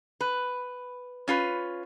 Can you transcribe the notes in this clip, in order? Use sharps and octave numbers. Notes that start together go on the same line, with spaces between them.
B4
C#4 F4 B4